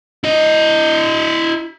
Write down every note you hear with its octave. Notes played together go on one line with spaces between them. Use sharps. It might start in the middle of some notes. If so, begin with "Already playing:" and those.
E4 D#5